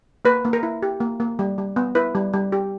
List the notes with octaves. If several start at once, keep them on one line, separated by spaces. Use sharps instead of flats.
A#3 B4
A#3
A#4
E4
G4
A#3
A#3
G3
G3
B3
E4 B4
G3
G3
G4